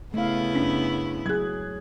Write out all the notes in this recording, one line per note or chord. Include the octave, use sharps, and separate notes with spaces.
C#3 A3 B3 E4 F5
F#2 D4 B6
F#3 G#4 F#6 G#6